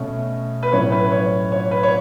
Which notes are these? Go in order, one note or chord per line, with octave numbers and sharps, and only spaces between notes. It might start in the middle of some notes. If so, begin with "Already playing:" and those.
Already playing: B2 A3 C#4
B4
A2 F#3 C#4 C#5
B4
C#5
C#5
B4
C#5